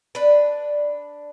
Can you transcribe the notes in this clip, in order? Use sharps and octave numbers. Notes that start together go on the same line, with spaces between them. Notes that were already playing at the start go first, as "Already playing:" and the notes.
D4 B4